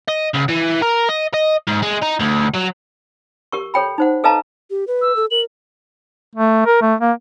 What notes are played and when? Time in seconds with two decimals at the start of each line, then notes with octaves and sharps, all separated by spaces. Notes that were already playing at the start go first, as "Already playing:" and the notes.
0.09 D#5
0.35 C#2
0.49 E3
0.82 A#4
1.09 D#5
1.34 D#5
1.68 G#2
1.83 G#3
2.03 D#4
2.21 D2
2.55 F#3
3.52 G4 A#4 C#6
3.74 A4 C#5 G5 B5
3.98 D#4 C5 F#5
4.24 A4 B4 D#5 F5 A5 A#5
4.70 G4
4.87 B4
5.02 E6
5.16 A4
5.31 A#4 F#7
6.36 A3
6.66 A#4
6.82 A3
7.01 A#3